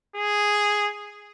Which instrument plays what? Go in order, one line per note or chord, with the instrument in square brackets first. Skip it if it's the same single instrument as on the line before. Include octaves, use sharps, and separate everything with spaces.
[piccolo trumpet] G#4